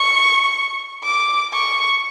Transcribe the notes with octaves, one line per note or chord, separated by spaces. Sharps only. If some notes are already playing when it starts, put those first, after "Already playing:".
Already playing: C#6
D6
C#6